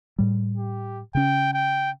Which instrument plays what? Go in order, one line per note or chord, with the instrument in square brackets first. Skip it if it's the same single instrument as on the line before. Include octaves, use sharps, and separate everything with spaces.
[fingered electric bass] A2 G3
[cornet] G4
[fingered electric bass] C#3 C#4 [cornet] G5
[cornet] G5